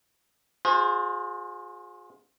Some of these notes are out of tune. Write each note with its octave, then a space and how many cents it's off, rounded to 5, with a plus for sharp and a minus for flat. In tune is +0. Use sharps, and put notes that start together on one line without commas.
F4 +45 G#4 +0 C5 +0